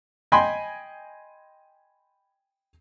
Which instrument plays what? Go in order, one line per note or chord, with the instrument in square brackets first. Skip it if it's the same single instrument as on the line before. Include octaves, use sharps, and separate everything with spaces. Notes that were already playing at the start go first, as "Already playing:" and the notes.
[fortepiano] D#5 G5 G#5 B5 C6